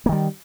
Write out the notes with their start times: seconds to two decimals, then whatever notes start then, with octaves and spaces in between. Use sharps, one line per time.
0.06 A#3
0.09 D#3
0.12 G3